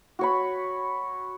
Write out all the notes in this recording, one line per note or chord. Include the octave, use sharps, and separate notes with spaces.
F#4 C#5 B5